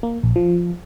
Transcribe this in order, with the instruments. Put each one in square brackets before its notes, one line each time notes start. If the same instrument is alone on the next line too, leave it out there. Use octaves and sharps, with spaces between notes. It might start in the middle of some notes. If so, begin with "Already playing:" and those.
[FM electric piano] A#3
A#1
F3